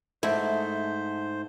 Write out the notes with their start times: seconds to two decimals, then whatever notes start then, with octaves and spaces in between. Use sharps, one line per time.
0.23 G#2 A3 E4 C5